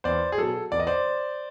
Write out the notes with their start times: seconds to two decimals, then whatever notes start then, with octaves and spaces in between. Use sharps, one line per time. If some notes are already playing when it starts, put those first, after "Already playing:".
0.04 E2 C5 D5
0.32 G#4
0.38 B2 F#3 A4
0.72 E2 D5
0.80 D#5
0.87 C5 D5